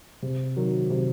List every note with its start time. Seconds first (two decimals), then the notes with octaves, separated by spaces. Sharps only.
0.22 C3
0.56 D#3 F#3
0.90 C3